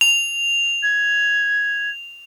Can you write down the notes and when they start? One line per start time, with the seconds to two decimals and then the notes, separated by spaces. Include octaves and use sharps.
0.01 F7
0.83 G#6